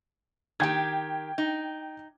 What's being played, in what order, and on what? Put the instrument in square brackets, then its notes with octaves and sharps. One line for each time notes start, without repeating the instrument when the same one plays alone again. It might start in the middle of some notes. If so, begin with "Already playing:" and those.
[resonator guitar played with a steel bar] D#3 G4 [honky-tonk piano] G5 G#6
[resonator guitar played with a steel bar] D#4